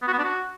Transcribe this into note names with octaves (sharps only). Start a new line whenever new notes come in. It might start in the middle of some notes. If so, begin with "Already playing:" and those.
B3
F#4
B3
D4
F#4